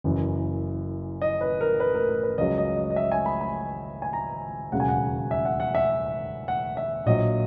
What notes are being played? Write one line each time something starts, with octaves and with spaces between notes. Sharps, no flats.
F#1 F#2 E3
D#5
B4
A#4
B4
A#4
A#4
B4
C#2 C#3 F#3 D#5
D#5
D#5
D#5
E5
G#5
B5
B5
G#5
A#5
E1 D#2 C#3 F#3 F#5
G#5
F#5
E5
F#5
F#5
E5
F#5
E5
A#1 A#2 F#3 D#5